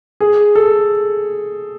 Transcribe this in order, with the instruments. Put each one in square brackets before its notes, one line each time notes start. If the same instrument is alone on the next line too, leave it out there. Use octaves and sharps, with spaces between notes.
[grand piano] G#4
A4